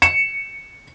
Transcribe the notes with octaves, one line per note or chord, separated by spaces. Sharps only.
C#7 E7